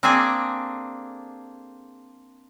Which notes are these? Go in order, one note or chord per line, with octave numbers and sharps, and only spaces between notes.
A#3 C4 D4 G#4 A4 G#5